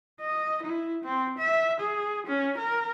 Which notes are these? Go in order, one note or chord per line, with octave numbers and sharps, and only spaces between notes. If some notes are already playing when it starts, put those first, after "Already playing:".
D#5
E4
C4
E5
G#4
C#4
A#4